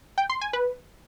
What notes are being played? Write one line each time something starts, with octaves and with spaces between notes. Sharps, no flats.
G5
C6
G#5
B4